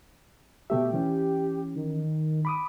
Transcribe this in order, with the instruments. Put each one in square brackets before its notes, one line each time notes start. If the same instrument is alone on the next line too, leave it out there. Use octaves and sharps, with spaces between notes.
[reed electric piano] B2 A3 E5 [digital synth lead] G4
[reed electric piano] E3 C#4
[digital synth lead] D#3
[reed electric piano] B5 D6 D#6